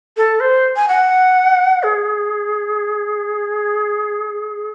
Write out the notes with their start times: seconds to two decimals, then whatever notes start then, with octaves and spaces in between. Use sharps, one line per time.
0.17 A4
0.40 C5
0.76 G#5
0.88 F#5
1.83 G#4